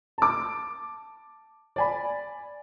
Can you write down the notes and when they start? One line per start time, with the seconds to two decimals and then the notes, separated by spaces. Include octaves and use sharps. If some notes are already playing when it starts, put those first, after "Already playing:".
0.18 A5 D6
1.76 D5 G#5 B5